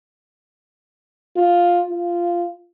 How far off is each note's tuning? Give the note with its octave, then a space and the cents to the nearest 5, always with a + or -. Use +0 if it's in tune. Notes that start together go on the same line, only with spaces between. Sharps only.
F4 +5
F4 -10